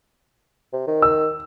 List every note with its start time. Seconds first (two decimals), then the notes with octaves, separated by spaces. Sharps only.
0.73 C3
0.87 D#3
1.02 E6